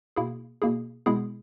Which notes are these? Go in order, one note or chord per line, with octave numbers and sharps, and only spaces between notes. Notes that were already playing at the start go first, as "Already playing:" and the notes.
B2 A#3 E4 G#4
B2 A#3 E4 G#4
B2 G#3 B3 E4 G#4